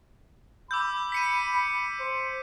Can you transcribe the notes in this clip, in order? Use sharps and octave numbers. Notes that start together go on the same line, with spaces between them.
B5 D6 E6 G6
B6 C#7 D#7
C5